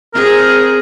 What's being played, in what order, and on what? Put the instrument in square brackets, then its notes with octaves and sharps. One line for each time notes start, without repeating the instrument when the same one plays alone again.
[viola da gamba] C4 G#4 [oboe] A#4